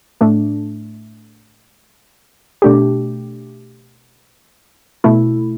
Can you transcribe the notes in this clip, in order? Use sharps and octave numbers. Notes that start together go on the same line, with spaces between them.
A2 A3 D4
B2 A3 D4 G4
B2 A3 E4